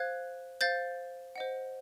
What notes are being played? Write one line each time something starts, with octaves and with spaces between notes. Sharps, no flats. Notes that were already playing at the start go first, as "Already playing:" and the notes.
Already playing: C5 F5 F#6 G#6
C5 F5 G6 A6
C5 D#5 F#5